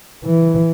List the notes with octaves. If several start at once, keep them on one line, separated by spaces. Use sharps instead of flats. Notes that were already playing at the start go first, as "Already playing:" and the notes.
E3